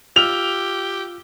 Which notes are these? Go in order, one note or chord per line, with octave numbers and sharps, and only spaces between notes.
F4 G4 E6 F6 F7